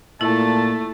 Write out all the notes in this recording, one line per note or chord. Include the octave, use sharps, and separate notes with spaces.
A#2 A3 E4 A5